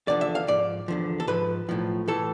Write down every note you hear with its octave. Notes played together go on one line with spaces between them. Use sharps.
E2 D3 F3 D5
E5
F5
G#2 F3 D5
E2 D3 F3
A4
G#2 F3 B4
B1 A2 F3
A2 E3 A4